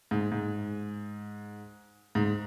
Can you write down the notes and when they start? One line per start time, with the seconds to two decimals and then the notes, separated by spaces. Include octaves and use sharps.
0.11 G#2
0.32 G#2
2.15 G#2